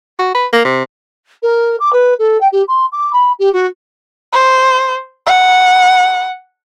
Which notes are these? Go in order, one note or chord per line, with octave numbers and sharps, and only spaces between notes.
F#4
B4
A#3
C3
A#4
D6
B4
A4
G5
G4
C6
D6
B5
G4
F#4
C5
F#5